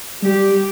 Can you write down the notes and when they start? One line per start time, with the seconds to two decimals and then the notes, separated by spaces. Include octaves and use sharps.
0.22 G3 G4